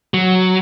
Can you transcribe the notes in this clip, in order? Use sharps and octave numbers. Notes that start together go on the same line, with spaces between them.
F#3